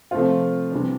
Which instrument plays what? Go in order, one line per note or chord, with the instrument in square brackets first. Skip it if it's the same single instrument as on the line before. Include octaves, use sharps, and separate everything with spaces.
[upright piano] C3 F3 A3 C4 F4
C3 E3 G3 D4